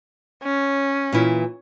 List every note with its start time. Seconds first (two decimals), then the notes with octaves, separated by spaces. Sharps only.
0.44 C#4
1.13 A#2 E3 E4